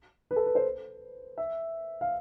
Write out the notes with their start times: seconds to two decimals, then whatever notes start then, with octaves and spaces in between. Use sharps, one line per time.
0.31 B4
0.36 A4
0.46 B4
0.55 C5
1.38 E5
2.01 F5